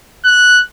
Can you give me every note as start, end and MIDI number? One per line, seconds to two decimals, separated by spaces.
0.25 0.60 90